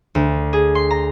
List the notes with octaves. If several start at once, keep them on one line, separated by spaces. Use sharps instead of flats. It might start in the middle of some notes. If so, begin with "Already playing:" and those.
D2
G#4
C6
A#5